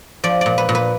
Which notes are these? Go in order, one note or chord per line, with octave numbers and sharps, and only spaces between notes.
F3 D5
A#2 D5
B4
A#2
B4